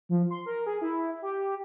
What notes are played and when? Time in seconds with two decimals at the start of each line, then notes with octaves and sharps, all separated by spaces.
0.09 F3
0.30 C6
0.46 A#4
0.66 G#4
0.81 E4
1.22 G4